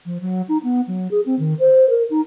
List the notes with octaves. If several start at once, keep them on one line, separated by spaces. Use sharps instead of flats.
F3
F#3
D#4
B3
F#3
G#4
C4
D#3
C5
A#4
D#4